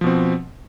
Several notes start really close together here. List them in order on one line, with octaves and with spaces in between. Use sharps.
F3 B2 C4